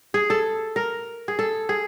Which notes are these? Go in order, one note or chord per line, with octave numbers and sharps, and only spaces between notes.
G#4
A4
A#4
G#4
A4
G#4